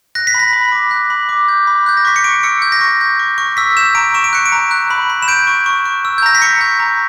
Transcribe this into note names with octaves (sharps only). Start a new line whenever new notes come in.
F#6 A#6
B6
B5
A#6
B5
D6
F#6
B5
D6
G6
B5
F#6 G6
A#6
C#6 B6
C#7
C#6 D7
E6 C#7
G6
A#6
C#6
G6
C#6
C#6
E6 B6
G6 E7
A#5 D7
C#6 E7
D7
F#6 C#7
D7
A#5
F#6
B5
B5
E7
G6 D7
C#6
C#6
C#6
E6
G6
A#5 A#6
B6
C#6 C#7
G6
A#5